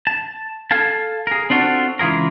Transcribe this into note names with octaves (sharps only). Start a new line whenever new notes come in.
A5
A4 F5 G#5 A5
G#4 A#4
C4 D4 F4 F#4 A4
C#2 E3 F4 G#4 A#4